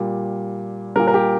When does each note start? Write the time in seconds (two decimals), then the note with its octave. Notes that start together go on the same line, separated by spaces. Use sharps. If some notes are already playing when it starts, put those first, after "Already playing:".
Already playing: A#2 G3
0.96 G3 A#4
0.99 A#2
1.07 A#4
1.14 G4